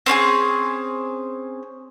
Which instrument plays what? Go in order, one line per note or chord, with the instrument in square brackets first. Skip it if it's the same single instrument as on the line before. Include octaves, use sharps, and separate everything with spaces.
[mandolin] C4 C#4 F4 G#4